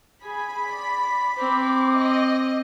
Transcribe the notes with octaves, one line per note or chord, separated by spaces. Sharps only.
G#4 G#5 B5
D5
C4 D6
D#5